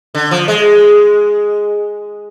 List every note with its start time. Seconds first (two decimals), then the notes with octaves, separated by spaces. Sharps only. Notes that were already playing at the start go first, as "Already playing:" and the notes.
0.15 D3
0.31 F3
0.48 G#3